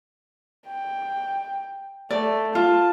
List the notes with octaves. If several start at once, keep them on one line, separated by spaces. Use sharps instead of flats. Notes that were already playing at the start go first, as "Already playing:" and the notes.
G5
A3 D5
F4 A5